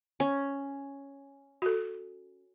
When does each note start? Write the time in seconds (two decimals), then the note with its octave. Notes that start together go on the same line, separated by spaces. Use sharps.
0.20 C#4
1.62 F#4 A4